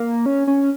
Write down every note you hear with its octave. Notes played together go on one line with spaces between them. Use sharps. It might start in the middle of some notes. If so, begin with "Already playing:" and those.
Already playing: A#3
C#4
C#4